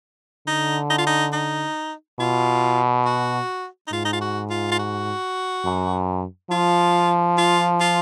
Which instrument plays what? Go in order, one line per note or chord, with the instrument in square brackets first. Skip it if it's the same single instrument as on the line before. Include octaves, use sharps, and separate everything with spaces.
[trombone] D3 [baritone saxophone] D#4
[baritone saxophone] D#4
F4
D#4
D#4
[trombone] B2 [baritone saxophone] F4
[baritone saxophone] F#4
D#4
[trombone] G#2 [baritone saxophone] F4
[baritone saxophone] D#4
F4
F#4
F4
F4
F#4
[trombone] F#2
[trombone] F3 [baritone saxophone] F4
[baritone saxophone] F4
F4